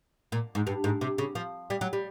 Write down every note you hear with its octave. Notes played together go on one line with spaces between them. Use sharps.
A#2
G#2
G2
G#2
C3
C#3
F3
G3
F#3
G3